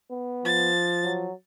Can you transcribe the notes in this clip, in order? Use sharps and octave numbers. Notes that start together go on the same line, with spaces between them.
B3
F3 A6
F#3